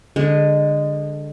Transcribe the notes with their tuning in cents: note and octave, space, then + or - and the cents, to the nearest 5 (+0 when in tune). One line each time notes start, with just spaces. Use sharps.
D3 +0 G#3 -20